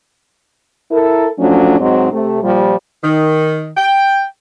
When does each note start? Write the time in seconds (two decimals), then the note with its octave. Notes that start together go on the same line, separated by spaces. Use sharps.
0.91 E4 A4 A#4
1.39 F3 F#3 A3 C#4 D4
1.80 G#2 F#3 C4 D#4
2.12 C3 A3
2.43 A#2 F3 G3
3.04 D#3
3.77 G5